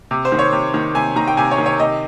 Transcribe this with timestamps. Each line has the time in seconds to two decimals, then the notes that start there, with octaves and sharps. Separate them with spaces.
0.11 C3
0.25 C5
0.32 D#3
0.39 C#5
0.52 C3
0.74 D#3
0.95 C3 G#5
1.16 D#3 A#5
1.28 G5
1.37 C3 G#5
1.51 C#5
1.58 D#3
1.66 C#5
1.80 C3 D#5